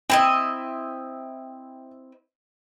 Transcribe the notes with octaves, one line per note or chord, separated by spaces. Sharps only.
C4 E4 D#5 G5